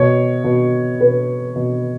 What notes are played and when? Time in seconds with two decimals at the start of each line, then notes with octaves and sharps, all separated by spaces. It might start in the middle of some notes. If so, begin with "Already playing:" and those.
Already playing: B2 C#5
0.44 B2
1.01 B2 B4
1.56 B2